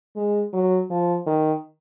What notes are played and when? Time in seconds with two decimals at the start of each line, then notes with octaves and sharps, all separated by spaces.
0.16 G#3
0.53 F#3
0.90 F3
1.27 D#3